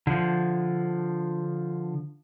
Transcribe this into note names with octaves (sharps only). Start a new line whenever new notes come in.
D3 F3